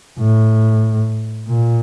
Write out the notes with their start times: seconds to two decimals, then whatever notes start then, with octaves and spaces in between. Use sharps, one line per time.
0.19 A2
1.49 A#2